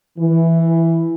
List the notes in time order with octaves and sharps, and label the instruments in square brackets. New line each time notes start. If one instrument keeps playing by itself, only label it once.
[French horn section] E3